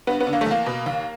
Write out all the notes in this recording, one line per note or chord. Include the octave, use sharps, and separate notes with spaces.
G2 B3
B3
D3
A#3
A3
E2 A#3
B2
D#2